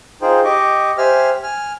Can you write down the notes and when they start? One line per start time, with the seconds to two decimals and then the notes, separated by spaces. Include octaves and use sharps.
0.22 D#4 F4 G#4 C5 G5
0.44 G4 D#5 C#6 D6
0.98 G4 C5 E5 G#5 E6 F6
1.43 G#5 F6